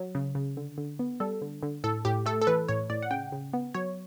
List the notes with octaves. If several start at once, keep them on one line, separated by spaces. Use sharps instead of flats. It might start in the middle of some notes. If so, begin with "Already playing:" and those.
Already playing: F#3
C#3
C#3
D3
D3
B3
G3 A4
D3
D3
A2 A4
A2 G4
A3 A4
A4
E3 B4
A2 C#5
A2 D5
F#5
C#3 G5
C#3
B3
F#3 C#5